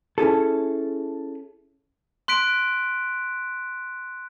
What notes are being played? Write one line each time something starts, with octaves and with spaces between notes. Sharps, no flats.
C#4 E4 G#4 A4
C6 F#6 B6 D7